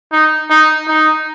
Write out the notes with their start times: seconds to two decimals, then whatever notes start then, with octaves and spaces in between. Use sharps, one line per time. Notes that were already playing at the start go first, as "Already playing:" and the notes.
0.12 D#4
0.50 D#4
0.88 D#4